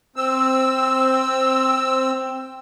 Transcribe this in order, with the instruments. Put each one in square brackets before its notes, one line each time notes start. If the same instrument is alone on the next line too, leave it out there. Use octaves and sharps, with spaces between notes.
[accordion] C4 E6